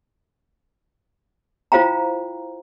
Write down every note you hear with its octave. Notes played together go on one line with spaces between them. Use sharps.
E4 F4 C5 F5 G5 A#5